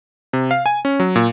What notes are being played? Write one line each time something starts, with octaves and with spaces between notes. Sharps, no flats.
C3
F5
G#5
C#4
F#3
A#2